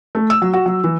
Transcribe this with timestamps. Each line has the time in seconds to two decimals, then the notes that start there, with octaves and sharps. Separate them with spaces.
0.15 A3
0.30 E6
0.42 F#3
0.53 F#4
0.66 F#3
0.84 E3